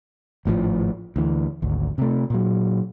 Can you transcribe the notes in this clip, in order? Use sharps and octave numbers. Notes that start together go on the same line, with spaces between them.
G#1 A2 C#3 F3
D2 E3
G#1 D2
C3 A3
A#2 F#3